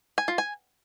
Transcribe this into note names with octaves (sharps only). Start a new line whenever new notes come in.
G#5
F4
G#5